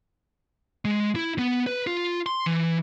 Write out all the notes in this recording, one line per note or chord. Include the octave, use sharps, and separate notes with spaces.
G#3
E4
B3
B4
F4
C6
E3